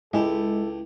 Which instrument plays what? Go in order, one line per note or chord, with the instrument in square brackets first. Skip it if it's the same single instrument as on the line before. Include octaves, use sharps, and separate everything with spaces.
[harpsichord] C#2 G4 [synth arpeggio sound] G#3 [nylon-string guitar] E4 [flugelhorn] A4